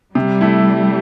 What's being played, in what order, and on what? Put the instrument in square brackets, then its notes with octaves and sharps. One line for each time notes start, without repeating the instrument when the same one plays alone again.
[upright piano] C3 [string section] G3
[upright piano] A3 E4